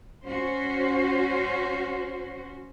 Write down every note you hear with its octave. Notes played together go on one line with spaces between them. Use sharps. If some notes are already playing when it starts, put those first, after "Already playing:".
C#4 F#4 C5